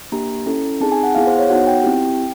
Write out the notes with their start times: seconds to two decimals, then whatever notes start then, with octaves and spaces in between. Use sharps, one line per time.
0.12 A#3 D4 G4 A#5
0.46 C#4 E4 A4
0.80 C4 D#4 G#4 A5
0.92 G#5
1.03 F#5
1.15 B3 E4 G#4 F5
1.27 C5
1.39 C#5
1.50 B3 D#4 F#4 F#5
1.67 G5
1.84 C4 E4 G4